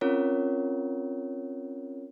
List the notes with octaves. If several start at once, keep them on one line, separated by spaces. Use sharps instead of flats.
C4 C#4 F4 A#4 C#5